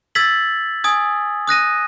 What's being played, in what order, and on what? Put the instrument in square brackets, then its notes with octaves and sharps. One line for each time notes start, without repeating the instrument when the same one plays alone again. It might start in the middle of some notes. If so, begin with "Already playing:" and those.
[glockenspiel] E6 G#6 A6 B6 F#7
G#5 D#6 G#6
D#6 F#6 A#6 D#7